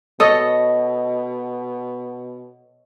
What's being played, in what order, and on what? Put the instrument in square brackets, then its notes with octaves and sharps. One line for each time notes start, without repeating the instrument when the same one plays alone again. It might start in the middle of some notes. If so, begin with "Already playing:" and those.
[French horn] B2 [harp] A4 C#5 D#5